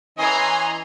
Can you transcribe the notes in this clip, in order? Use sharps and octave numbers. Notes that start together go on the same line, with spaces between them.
E3 C#4 D#5 G#5 A#5 C6